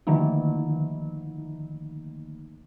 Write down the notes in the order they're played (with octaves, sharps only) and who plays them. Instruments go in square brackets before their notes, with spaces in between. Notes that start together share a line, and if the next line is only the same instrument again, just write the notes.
[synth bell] D3 D#3 F3 A3 A#3 D#4